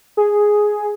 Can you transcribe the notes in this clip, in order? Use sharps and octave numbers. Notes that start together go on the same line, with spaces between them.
G#4